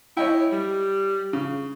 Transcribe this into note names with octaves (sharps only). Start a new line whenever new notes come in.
E4 C#5 D#5 G5
G3
C#3